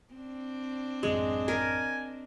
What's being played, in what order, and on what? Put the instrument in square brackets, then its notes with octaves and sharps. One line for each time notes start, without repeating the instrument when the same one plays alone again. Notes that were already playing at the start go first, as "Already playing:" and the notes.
[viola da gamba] C4 D4
[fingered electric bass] A1 F#2 [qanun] G#3
[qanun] A#4 [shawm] G#5